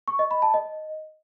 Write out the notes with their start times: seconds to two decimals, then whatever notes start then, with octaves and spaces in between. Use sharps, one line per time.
0.08 C#6
0.19 D#5
0.31 B5
0.42 A5
0.54 D#5